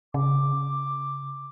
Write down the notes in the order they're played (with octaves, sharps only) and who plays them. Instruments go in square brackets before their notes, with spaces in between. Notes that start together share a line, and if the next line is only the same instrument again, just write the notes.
[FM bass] C#3 [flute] D6